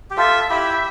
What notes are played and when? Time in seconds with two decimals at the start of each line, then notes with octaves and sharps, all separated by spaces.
0.11 G4
0.17 F4 A4 E5
0.50 E4 G4 E5